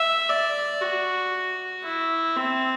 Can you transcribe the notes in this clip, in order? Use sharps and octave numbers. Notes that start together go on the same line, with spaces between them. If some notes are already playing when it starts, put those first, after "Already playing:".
Already playing: E5
D5
F#4
E4
C4